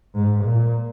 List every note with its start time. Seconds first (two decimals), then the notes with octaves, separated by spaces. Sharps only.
0.15 G#2
0.44 A#2